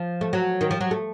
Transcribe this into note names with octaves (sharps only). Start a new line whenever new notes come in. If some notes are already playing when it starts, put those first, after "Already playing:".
Already playing: F3
A3
F#3
D#3
F3
F#3
A3